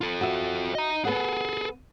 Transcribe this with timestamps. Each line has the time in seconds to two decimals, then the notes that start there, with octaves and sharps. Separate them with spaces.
0.01 F4 A4
0.21 F#4 E5
0.75 D#5 A#5
1.05 B3 G#4 A4 B4 F#5